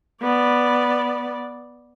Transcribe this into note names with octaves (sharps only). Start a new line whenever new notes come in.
B3 D5